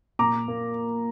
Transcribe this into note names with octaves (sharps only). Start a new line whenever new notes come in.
A#2 A#5 D6
A#3